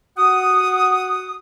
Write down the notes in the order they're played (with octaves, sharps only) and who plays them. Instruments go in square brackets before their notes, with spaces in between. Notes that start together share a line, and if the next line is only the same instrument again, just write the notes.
[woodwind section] F#4 F#5 D#6